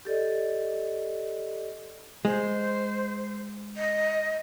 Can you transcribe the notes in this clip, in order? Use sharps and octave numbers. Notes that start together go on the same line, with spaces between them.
G4 A4 D5 D#5
G#3 C5
D#5